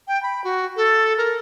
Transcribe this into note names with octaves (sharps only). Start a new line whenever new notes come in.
G5
B5
F#4
A4
A#4